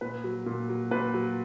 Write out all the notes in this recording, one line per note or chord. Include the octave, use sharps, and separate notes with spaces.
A#2 B4
F#3
A#2
F#3
A#2 B4
F#3